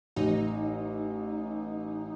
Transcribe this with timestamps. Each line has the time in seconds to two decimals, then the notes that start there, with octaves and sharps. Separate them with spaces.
0.16 A1 D#4